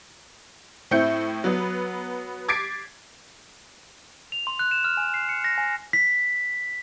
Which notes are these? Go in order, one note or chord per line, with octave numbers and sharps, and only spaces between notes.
A2 C4 E4 G6 C#7
F#3 B3
D6 G#6 A6 B6 C7 D7
F7
C6
F#6
E7
F6
G#5
C7
C#7
A#6
G#5
B6